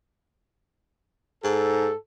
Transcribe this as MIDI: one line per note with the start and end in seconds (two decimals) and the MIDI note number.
1.44 1.91 44
1.44 1.96 69